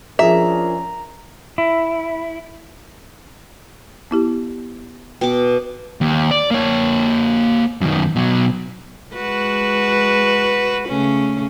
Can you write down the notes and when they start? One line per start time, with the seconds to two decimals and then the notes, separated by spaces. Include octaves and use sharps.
0.19 F3 C#4 D4 G#4 A#4 E5 A#5
1.58 E4
4.11 B3 E4 G4
5.21 B2 G5 D6
6.01 D#2
6.31 D5
6.51 A#3 C#5
7.81 F#2 D#3
8.16 B2 F#3
9.14 G#3 F#4 B4
10.87 C#3 A3 C#4